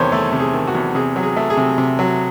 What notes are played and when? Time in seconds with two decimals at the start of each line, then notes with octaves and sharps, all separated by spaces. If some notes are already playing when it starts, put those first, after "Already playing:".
Already playing: E2 C3 D#3 A3 C5 C#5
0.12 A3 A4
0.33 C3
0.40 G#4
0.54 D#3
0.68 F#4
0.75 E2
0.95 C3 G#4
1.16 F#3
1.23 G#4
1.36 A3
1.50 G#4
1.57 C3
1.78 C3
1.99 F#3